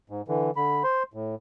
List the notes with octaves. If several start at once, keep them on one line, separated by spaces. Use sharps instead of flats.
G#2
D3 E3
D3 B5
C5 C6
A2